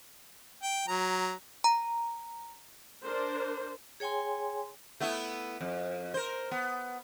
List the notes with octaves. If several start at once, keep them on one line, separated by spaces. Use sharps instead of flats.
G5
F#3 A#5
A#5
D4 A#4 C5
G#4 C#5 G5 G#5 C6
A3 B3 E4
F2
A#4 C5
B3